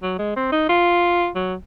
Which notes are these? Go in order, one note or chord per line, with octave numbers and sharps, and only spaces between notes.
F#3
G#3
C4
D#4
F4
F#3